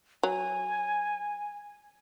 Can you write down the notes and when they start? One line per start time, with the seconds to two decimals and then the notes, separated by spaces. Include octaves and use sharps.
0.23 F#3 G#5